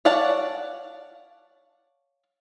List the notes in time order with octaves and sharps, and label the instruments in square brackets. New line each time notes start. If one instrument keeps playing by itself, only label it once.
[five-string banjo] C#5 D5 F5 F#5 A5